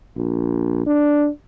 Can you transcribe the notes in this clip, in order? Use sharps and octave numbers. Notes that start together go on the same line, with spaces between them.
A#1
D4